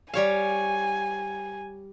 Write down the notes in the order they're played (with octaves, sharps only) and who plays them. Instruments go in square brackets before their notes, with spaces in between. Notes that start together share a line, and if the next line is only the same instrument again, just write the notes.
[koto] G3 C#5 F5 [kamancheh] G#5